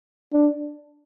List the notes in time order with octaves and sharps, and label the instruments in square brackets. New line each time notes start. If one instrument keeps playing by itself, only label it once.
[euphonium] D4